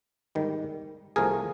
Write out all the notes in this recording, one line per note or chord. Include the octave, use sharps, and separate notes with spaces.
G#2 D#3 G3
C2 C3 F3 A3 G#4 A#4